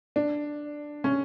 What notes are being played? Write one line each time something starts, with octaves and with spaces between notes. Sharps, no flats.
D4
C#4